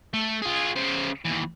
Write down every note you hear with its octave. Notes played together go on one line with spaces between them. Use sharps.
A3
F4 G#4
C#3 C5
D#2 E3